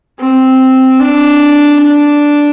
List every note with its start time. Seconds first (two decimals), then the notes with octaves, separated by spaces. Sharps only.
0.20 C4
1.00 D4
1.81 D4